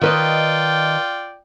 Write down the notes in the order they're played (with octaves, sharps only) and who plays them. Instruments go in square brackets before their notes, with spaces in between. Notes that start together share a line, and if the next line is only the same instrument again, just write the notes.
[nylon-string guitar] D#3 B4 D#5 [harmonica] F4 D5 G5